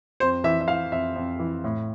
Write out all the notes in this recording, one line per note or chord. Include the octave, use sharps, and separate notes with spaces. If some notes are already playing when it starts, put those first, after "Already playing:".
F2 C5
E3 E5
E5
E3 F5
F2 E5
F2
E3
A2